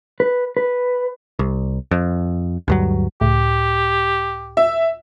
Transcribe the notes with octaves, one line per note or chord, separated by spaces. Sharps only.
B4
B4
C2
F2
D2 G2 F#3
C#2 A2 G4
E5